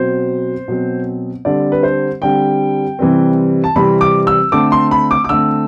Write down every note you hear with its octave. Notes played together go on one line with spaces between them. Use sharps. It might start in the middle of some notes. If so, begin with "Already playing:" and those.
Already playing: B2 F#3 C4 C5
B2 F#3 C4
D3 G3 C4 D5
B4
C5
D3 G3 C4 G5
C3 E3 G3 C4
A5
C3 E3 G3 C4 B5
D6
E6
D3 A3 C4 D6
C6
B5
D6
D6
D3 A3 C4 E6